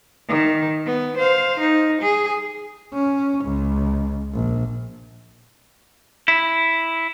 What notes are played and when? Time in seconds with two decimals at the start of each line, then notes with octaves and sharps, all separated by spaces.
0.29 D#3
0.86 B3
1.17 C5 F5
1.60 D#4
2.01 G#4
2.94 C#4
3.45 C#2
4.34 A#1
6.28 E4